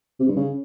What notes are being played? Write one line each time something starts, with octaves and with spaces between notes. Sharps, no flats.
C3
G2
C#3